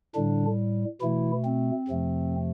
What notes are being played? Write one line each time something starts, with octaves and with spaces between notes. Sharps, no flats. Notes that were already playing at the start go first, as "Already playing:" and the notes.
A2 D3 G3 D4
B2 E3 A3 E4
C4
F2 C3 F3 A3